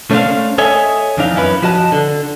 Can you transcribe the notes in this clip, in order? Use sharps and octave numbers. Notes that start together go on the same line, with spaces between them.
A3 C#4 D4 F#4 C5 F5
A4 C#5 D#5 E5 G#5
F2 E3 D4 D#4 F5
F#2 C#4 E4 A4 B4
F3 F#4 D#5 A5
D3